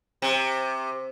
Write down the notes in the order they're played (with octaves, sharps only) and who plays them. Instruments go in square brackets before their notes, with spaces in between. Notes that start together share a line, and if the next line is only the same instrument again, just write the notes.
[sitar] C3